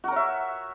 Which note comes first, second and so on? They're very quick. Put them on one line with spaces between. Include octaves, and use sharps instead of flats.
F#4 A#4 C#5 E5